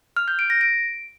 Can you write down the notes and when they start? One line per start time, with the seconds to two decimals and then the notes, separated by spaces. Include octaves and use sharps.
0.17 F6
0.28 G6
0.39 D7
0.50 A#6
0.61 D7